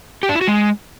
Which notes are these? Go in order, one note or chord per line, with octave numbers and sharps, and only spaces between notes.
G4
D4
E4
F#4
G#3